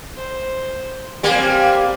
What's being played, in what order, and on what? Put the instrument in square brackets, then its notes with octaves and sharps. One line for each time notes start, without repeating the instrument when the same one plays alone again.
[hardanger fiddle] C5
[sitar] G3 A#3 [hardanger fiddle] C4 G#5